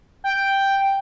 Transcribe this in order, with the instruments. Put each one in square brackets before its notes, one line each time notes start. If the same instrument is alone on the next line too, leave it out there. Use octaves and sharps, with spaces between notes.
[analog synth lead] G5